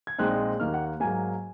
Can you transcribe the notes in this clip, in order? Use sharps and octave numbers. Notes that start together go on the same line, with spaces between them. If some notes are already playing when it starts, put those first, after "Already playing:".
G#6
A#1 A#2 G#3 C4 D#4 F#6
D#2 D#3 A#3 D#4 F6
F#5
G#2 F#3 A#3 G#5